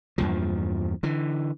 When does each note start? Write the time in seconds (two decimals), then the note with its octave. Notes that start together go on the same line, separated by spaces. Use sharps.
0.18 E2 G2 A#2 F3
1.03 D3 E3